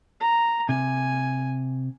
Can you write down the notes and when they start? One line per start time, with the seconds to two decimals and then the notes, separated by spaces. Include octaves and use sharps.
0.20 A#5
0.69 C3 G#5